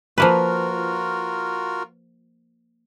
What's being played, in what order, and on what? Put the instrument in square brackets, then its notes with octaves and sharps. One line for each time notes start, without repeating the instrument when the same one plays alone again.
[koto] F3 A#3 B4 [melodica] F4 F#4 A#4